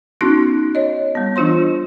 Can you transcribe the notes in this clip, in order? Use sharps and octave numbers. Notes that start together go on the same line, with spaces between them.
B3 C#4 D#4 F#4 C6 F#6
C#5 D#5
G3 B3
E3 D4 F4 C5 C6